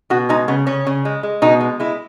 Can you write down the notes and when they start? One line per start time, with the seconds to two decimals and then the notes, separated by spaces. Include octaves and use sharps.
0.10 B2 F#4
0.29 G#3 D#4
0.48 C#3 B3
0.67 C#3 C#4
0.87 C#3
1.05 G#3
1.23 G#3
1.42 B2 D#4
1.61 G#3
1.80 G#3 E4